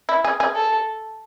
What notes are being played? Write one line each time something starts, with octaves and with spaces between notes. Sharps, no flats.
E4
G#4
G#4
A4